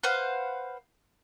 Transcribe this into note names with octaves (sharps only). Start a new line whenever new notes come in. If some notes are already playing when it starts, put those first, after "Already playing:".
B4 C5 F5 F#5